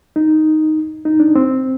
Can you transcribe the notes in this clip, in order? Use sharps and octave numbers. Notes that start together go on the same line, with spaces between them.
D#4
D#4
D4
C4